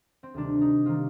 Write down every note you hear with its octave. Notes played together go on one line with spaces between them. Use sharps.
C4
D2 C3 D#3 G3 D4
D#4
C3 D#3 G3 F4